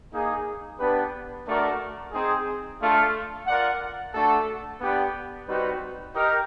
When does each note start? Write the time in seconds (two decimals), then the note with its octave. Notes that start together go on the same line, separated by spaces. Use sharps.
0.11 A#3 D#4 G#4
0.79 B3 D4 G4 B4
1.46 A3 D4 F#4 A#4 D5
2.12 C4 D#4 G#4
2.79 A3 D4 F4 A4
3.46 F4 A#4 D5 F#5
4.12 A3 D4 F#4 A4
4.79 B3 D4 G4 B4 D5
5.46 G3 C4 D#4 F#4 B4
6.13 D#4 G4 A#4